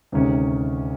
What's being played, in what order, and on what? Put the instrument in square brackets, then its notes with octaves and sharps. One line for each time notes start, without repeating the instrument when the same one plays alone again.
[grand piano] D2 C3 D#3 G#3 C#4